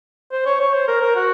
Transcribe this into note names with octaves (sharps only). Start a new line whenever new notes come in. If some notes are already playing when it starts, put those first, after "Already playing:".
C5
C#5
C#5
C5
A#4
A#4
F#4